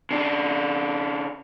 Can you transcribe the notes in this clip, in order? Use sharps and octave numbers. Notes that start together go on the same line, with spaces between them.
C#3 D4